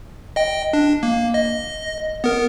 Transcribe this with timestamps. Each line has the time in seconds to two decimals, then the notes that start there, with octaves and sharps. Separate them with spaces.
0.36 D#5 G5
0.73 D4
1.03 A#3
1.34 D#5
2.24 B3 A#4